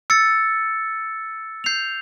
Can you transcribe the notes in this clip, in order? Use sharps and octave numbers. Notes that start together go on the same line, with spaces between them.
E6 A6 C#7
G6 C7 F7